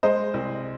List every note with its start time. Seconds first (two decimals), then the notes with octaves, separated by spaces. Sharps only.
0.03 G#3 C5 D#5
0.34 C2